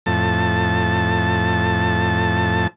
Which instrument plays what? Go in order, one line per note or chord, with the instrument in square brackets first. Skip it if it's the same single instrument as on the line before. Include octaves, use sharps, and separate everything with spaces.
[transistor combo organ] F2 A2 A5